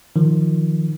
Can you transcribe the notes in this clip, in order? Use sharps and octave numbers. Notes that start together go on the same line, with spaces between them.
D#3 F3